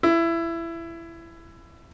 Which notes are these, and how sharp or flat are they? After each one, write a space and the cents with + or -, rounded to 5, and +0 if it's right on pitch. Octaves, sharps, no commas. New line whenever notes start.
E4 +20